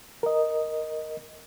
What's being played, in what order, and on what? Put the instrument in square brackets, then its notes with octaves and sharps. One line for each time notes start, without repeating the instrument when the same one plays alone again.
[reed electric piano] A#4 D#5